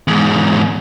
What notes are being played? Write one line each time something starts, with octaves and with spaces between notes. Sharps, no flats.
E2 G#2